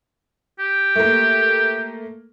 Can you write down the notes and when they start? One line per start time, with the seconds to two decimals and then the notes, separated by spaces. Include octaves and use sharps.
0.59 G4
0.96 A3 A#3